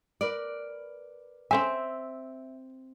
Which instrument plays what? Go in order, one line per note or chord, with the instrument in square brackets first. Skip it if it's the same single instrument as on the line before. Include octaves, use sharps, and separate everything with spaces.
[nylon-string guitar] A#4 B4 D5
[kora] C4 E5 [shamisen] C#4 A4 G#5